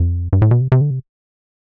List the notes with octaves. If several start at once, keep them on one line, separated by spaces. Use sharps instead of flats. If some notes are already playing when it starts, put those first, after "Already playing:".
Already playing: F2
G2
A2
B2
C3
C3
D3
C3